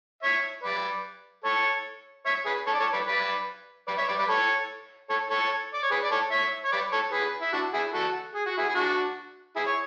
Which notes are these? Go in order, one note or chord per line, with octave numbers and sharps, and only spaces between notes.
C#5 E5
B4 D5
A4 C#5
C#5 E5
G#4 B4
A4 C#5
D5
A4 C#5
B4 D5
B4 D5
B4 D5
C#5 E5
B4 D5
B4 D5
A4 C#5
A4 C#5
A4 C#5
D5
C#5
G#4 B4
D5
A4 C#5
C#5 E5
C#5
B4 D5
A4 C#5
G#4 B4
E4
D4 F#4
E4 G#4
F#4 A4
G#4
F#4
E4 G#4
G#4
D4 F#4
E4 G#4
C#5